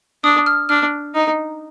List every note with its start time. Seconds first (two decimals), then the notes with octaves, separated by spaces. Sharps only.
0.24 D4 D#6
0.46 F6
0.69 D4 F6
1.14 D#4